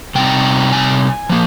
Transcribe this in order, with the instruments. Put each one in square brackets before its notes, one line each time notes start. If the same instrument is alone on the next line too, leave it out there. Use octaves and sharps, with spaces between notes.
[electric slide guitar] C3 G3 C4 D#4 G5
G#5
F3 A#3